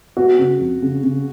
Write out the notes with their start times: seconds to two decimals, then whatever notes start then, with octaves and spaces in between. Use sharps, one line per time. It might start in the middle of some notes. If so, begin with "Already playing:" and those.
0.17 B3 F#4
0.39 C#3
0.60 F2
0.82 C#3
1.04 C#3